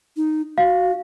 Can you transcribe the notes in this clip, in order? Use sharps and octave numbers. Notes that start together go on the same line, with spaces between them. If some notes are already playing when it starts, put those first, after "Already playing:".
D#4
F#4 F5